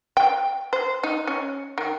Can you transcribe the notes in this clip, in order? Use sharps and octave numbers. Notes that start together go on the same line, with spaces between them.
G5
C5
D#4
C#4
D#3